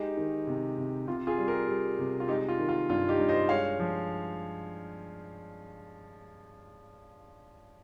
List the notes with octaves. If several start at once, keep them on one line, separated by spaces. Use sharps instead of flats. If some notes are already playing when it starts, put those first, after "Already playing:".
Already playing: G#3 D#4 G4
D#3
C3
C3
C3 F4
F4 G#4
G3
G4 A#4
G3
C3
F4
G#3 D#4 G4
F4
D#3
F4
G2 F4
D#4 G4
G2
C5 D#5
G#3 C#5 F5
F3